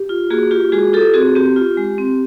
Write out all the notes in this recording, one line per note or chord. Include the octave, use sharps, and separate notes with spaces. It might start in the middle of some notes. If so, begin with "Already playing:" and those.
Already playing: G4
F4
A#3 F#4 G#4
F4 G4
G#3 F#4 G#4
F4 G4 A4
C4 F#4 G#4
C4 G4
F4
G#3
C4